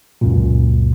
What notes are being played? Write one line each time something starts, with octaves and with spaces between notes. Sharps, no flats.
C#2 F#2 A#2